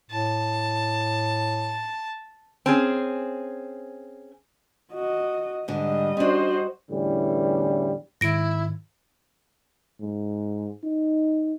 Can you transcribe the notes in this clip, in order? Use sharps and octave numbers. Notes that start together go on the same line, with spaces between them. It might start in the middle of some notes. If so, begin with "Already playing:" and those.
A2 A5
C4 C#4 G#4
F#4 D#5
G#2 D3 G3 D#5
C#4 D4 F#4 C5
E2 A2 D3 E3 G3 C#4
G#2 D#3 E4 A#6 D7
G#2
D#4